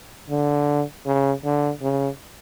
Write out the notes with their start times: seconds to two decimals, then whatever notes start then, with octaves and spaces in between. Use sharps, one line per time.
0.30 D3
1.06 C#3
1.44 D3
1.82 C#3